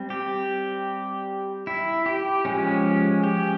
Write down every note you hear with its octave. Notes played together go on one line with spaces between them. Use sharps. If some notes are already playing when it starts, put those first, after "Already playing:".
Already playing: G3 C4
G4
E4
G4
F3 G#3 C#4
G4